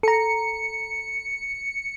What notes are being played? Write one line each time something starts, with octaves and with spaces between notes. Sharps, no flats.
A4 A#5 C#7